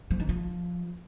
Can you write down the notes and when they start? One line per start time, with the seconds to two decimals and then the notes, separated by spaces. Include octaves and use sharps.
0.11 F3
0.20 D#3
0.29 F3